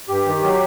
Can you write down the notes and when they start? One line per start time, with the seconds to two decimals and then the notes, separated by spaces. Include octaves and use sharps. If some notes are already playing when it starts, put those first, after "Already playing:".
0.09 G2 G4
0.26 D#3
0.43 F#3